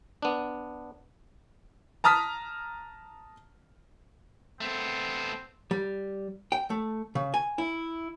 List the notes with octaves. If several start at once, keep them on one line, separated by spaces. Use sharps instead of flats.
B3 D4
A5 A#5 D#6 F6 B6
A3 B3 C4
G3
G5
A3
C#3
G#5
E4